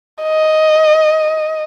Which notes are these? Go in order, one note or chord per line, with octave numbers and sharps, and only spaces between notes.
D#5